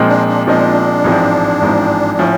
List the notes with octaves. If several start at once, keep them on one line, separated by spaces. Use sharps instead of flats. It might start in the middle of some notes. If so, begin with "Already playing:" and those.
Already playing: A#2 F3 G#3 C4 D#4
D4
D4
A#2 F3 G#3 C4 D4 D#4
A1 G#2 F3 G#3 C4
A1 G#2 F3 G#3 C4
A2 F3 C#4